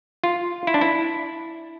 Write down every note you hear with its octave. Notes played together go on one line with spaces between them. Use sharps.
F4
E4
D4
E4